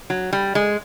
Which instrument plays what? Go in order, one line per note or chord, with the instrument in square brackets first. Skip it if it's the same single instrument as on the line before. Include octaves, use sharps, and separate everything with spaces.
[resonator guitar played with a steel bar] F#3
G3
G#3